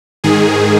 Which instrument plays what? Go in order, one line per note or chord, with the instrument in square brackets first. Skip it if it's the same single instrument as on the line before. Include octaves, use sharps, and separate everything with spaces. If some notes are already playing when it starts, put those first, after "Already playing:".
[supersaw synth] G#2 D#3 G#4